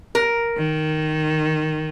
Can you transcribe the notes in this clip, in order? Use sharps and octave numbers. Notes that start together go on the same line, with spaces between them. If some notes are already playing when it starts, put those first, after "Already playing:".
A#4
D#3